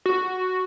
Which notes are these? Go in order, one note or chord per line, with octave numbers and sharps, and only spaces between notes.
F#4